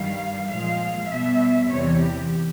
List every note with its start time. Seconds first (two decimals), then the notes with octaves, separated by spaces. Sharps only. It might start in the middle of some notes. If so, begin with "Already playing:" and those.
Already playing: G2 D#3 G3 F5
0.49 A#2 F3 G#3 F5
1.09 B2 G3 E5
1.70 E2 C3 E3 G3 C#5
2.01 G4